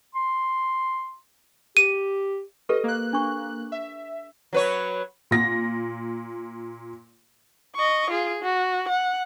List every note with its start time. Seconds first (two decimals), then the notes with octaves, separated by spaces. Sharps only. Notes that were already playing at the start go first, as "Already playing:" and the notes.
0.15 C6
1.77 G4 D#7
2.69 G4 A4 B4 D#5
2.84 A#3 F#6
3.13 D4 C#6
3.72 E5
4.53 F#3 B4 C#5
5.31 A#2 A#6
7.75 D#5 C#6
8.10 F4 G#4
8.42 F#4
8.89 F#5